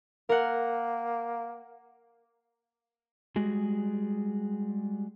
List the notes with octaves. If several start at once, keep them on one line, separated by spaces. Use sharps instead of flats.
A#3 A#4 F#5
G3 G#3 F#4 G#4